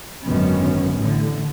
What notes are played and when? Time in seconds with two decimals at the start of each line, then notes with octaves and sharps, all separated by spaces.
0.24 G#1 F#2 D3 D#3 B3 C#4
0.98 A1 A2 D3